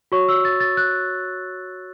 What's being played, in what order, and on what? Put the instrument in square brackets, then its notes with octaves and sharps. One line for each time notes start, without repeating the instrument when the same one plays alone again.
[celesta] F#4 C#5 C#6
E6
A6
A6
F#6